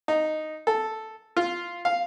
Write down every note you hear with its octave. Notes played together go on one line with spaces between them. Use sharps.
D#4
A4
F4
F5